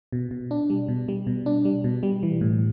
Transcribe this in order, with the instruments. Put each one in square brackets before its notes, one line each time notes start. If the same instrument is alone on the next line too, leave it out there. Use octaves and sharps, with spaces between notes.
[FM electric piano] B2
B2
D4
G3
B2
G3
B2
D4
G3
B2
G3
E3
A2